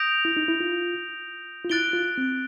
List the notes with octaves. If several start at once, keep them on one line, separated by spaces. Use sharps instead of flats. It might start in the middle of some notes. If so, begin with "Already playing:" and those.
Already playing: D#6 G6 A#6 D7 F7
E4
D#4
E4
F4
F4
E4 F#6 A6 D7 G7
F4
C4